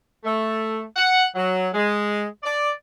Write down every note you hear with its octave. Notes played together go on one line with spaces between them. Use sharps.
A3
F#5
F#3
G#3
D5